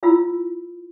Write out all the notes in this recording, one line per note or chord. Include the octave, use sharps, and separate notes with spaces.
E4 F4 B5 E6